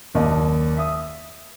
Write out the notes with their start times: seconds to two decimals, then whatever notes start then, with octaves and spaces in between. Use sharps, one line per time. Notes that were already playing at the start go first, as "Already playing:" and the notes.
0.14 F#1 D#2 D5 D#5 A5
0.77 E5 D#6